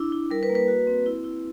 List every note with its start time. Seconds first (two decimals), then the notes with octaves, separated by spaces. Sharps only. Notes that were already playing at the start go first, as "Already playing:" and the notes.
Already playing: D4 E4
0.12 E4
0.31 G3 A#4
0.43 B4
0.50 A#3
0.55 B4
0.68 F#4
0.87 C4
1.06 E4
1.24 E4